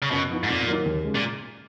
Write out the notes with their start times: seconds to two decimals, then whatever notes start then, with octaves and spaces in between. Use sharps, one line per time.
0.02 C#3
0.11 F#2 B2
0.30 F3 B3 D#4
0.43 G#2
0.48 F2 A#2
0.67 D#3 F#3 A#3 D#4
0.86 D#2
1.04 C#3 G#3
1.15 A#2